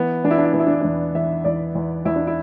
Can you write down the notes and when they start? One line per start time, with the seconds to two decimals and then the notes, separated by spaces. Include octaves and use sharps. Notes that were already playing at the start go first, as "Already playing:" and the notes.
Already playing: E3 B3
0.24 E3 D4
0.31 E4
0.38 D4
0.45 E4
0.53 E3 D4
0.60 E4
0.67 D4
0.74 E4
0.81 E2 D4
1.15 E3 E5
1.44 E2 D5
1.75 E2
2.05 E2 E4
2.16 D4
2.27 E4